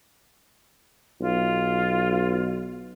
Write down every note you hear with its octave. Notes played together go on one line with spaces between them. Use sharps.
B1 F4